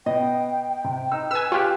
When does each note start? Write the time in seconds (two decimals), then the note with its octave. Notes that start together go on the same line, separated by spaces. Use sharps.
0.06 B2 D#5 G5
0.84 C3
1.11 D#4 E6
1.31 B4 G#5 E6
1.52 F4 G4 G5 C#6 F6 F#6